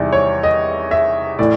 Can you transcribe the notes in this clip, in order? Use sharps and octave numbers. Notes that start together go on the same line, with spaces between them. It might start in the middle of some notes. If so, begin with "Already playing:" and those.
Already playing: E2 C3 D#3 G3 D5
C#5
D#5
E5
A2 E3 D5